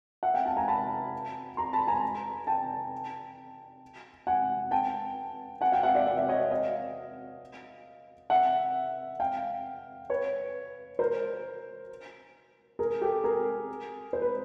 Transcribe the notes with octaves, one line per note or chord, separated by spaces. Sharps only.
E5 F#5
F5 G5
G5 A5
G#5 A#5
A5 B5
A#5 C6
A5 B5
G#5 A#5
G5 A5
F#5 G#5
G5 A5
F#5 G#5
F5 G5
E5 F#5
D5 E5
D5 E5
D5 E5
C#5 D#5
D#5 F5
E5 F#5
F5 G5
B4 C#5
A#4 C5
G#4 A#4
G4 A4
G#4 A#4
C5
B4